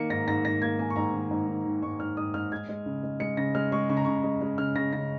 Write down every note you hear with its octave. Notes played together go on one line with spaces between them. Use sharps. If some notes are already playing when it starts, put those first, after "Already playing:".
Already playing: D#3 A#3 C#7
G#2 A#6
G#2 A#6
G#2 A#6
A#3 G#6
A#3 G#5
C#6
G#2 A#5
D#3
G#2
D#3
D#3
G#2 C#6
G#2 F6
G#2 D#6
G#2 F6
G#3 G#6
G#3
C#3
G#3
G#3 C#7
C#3 A#6
G#3 F6
G#3 C#6
C#3 C#6
A#5
C#3 C#6
G#3
G#3
C#3 F6
C#3 A#6
C#3 A#6